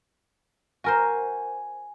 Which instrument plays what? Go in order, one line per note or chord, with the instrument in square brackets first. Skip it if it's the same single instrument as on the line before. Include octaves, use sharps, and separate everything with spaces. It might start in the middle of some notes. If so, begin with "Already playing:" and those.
[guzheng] F#4 A#4 C5 [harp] G#5